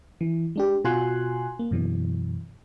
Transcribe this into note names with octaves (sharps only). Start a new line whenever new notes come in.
E3
G#3 D4 G4
B2 F4 F#4 G#5 C6 F#6
A#3
F#2 B2 E3